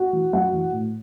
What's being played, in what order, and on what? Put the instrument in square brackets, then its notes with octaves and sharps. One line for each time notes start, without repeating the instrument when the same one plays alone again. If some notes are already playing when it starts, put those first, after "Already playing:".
Already playing: [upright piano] F#4 F#5
E3
F#2 F#4 F#5
E3
A2